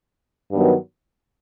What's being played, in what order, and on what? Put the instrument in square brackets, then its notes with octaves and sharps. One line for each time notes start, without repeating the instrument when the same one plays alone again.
[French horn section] G2 D#3 F#3 B3